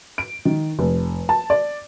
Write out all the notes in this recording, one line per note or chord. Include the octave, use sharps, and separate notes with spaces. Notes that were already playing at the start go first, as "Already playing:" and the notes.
D7
D#3
F1
A5
D5